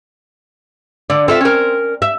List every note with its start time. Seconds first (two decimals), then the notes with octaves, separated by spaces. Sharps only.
1.10 D3 D5
1.28 C4 F4 A4 E5
1.41 C#4 A#4
2.02 E5